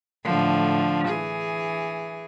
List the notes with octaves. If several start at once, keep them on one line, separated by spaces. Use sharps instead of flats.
A2 D3 F3
E3 G#4